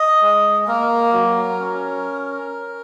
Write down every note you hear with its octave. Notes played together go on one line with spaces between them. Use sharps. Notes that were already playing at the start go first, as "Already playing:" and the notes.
Already playing: D#5
G#3
A#3 A#4
F#3
C#4